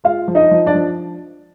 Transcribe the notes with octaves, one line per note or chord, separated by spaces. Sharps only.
G#3 F4 F5
F3
D#4 D#5
F3
D4 D5
F3